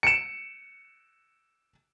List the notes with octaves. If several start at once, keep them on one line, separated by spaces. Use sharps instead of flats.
C#7 D7 E7